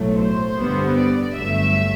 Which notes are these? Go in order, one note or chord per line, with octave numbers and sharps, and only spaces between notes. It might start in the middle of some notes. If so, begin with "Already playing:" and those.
Already playing: B1 A2 F#3 A3
C5
G2 D3 G3 B3
D5
G1 G2 F#3 A3 E5